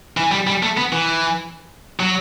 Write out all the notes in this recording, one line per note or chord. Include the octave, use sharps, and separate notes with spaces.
E3
G3
G3
A3
B3
E3
F#3